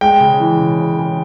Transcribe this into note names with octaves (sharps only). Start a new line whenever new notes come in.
G#3 G5
C#3
E3
C#3
C#3
C#3